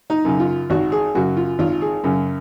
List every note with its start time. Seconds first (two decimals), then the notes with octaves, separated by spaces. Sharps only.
0.10 D#4
0.25 F#2 C#3
0.40 F4
0.70 G#1 F#4
0.92 G#4
1.15 F#2 C#3 F#4
1.37 F4
1.59 G#1 F4
1.82 G#4
2.04 F#2 C#3